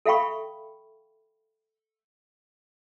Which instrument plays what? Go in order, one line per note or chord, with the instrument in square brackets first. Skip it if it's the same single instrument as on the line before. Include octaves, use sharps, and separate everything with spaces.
[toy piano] A4 E5 F5 G5 B5 C#6